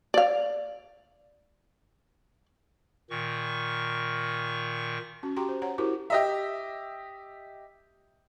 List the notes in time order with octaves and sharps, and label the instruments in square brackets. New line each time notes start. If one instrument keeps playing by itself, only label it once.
[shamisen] D5 F5
[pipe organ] A#2 D#3 C#6
[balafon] C#4 F#4
F#4 G4 G5 A#5 C6
C5
C#5 F#5 A#5
E4 F#4 G4 A#4 C5
[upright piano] G4 D#5 E5